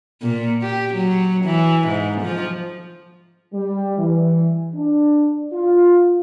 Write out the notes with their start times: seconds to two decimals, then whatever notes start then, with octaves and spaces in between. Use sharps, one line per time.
0.22 A#2
0.62 G4
0.94 F#3
1.45 E3
1.88 G#2
2.21 F3
3.54 G3
3.98 E3
4.75 D4
5.53 F4